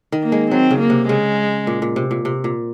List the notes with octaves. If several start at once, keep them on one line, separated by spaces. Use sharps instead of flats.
D#3
A#3
G#3
F#3 C4
C#3
A#3
C3
C#3 G#3
A#2
A#2
C3
A#2
C3
A#2